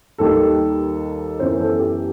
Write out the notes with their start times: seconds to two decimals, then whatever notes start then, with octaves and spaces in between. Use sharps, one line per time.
0.18 D#2 D#3 G3 A4
1.40 F#2 E3 B3 C5
1.60 A4
1.79 G4